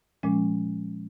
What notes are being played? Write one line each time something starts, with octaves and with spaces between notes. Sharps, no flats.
A#2 F3 G#3 C#4